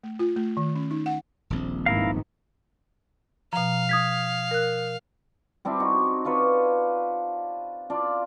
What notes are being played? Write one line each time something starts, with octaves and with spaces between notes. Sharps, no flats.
A3
F4
A3
D#3
C#4
D#4
F#5
D#1 A#1 C4
G#2 D#3 B3 E4 A#4 F5
B2 F3 F5 A#5
D#6 G#6 B6
A#4 F#6
G3 C4 D4 E4
D#4 F#4
D4 F4 B4 C#5
D4 F4 D5